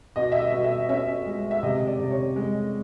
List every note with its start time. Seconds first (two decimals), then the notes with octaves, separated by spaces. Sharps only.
0.16 B2 D#5
0.32 E5
0.40 D#5
0.52 B2
0.64 E5
0.89 C#4 E5
1.26 G#3
1.51 E5
1.63 C3 D#5
1.87 D5
1.99 C3
2.11 C#5
2.36 G#3